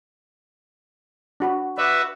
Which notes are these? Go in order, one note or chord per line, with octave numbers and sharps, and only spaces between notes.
D4 F#4 B5
F#4 B4 D5 E5